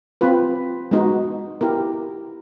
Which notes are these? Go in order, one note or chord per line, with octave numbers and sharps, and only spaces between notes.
C4 F4 B4
G#3 B3 D#4 F#4
B3 E4 G4 A#4